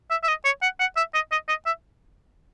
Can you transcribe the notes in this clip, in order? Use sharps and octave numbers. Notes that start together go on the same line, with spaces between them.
E5
E5
D#5
C#5
F#5
F#5
E5
D#5
D#5
D#5
E5